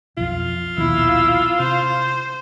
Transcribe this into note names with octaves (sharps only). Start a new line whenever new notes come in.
B1 F2 F4
A#1 D#2 B2 E4 E6
C3 C5